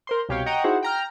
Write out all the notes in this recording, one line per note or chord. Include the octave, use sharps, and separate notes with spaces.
A#4 C5 C6
C2 B2 G4 C#5 F5 G5
D#5 F#5 G5 A#5 C#6 D#6
D#4 E4 F#4 G#4 C5 F#5
G5 A#5 F6